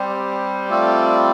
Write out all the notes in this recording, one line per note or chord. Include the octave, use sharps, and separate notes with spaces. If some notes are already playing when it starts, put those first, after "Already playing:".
Already playing: G3 C4 G4 C5
A3 C4 F4 A4 D5